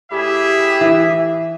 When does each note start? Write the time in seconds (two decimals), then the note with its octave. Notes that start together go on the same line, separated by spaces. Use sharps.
0.11 A2 E4 G4 G#4 E5
0.81 E3